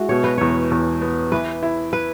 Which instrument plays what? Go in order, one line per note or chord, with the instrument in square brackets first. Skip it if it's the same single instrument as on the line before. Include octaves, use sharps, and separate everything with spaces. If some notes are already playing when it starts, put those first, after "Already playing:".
Already playing: [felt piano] G#3 [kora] E4 F#4
[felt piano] B2 [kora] C#5
[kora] B4
[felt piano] E2 [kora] C#5
[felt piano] E2
B3
[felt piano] E3 [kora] B4
[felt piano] E4
[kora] B4